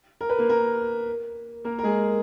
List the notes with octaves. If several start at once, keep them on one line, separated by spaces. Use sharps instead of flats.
A#4
B4
A#3 A#4
A#3 A#4
A#3 A#4
A#4
G#3 G#4